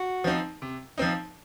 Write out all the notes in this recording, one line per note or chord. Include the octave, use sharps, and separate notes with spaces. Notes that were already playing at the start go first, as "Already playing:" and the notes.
Already playing: F#4
F3 C4 D#4
C3
F3 C4 D#4